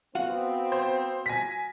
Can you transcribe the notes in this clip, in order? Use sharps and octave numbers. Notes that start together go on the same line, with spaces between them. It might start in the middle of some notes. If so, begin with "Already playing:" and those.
B3 C4 F#4 F5 F#5
C5
G#5 A#6 B6